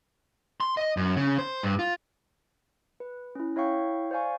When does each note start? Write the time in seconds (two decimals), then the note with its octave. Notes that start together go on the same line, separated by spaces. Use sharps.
0.60 C6
0.77 D#5
0.97 F#2
1.16 C#3
1.39 C5
1.63 G2
1.79 F4
3.00 B4
3.35 C#4 E4
3.56 E4 C#5 E5 F5 G5 C#6
4.11 C5 D5 F5 G#5 C#6